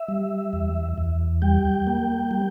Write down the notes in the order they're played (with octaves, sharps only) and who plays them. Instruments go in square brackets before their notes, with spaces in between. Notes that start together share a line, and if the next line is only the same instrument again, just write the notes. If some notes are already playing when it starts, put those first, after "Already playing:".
Already playing: [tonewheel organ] E5
G3
E2
E2
G3 G5
A#3
G3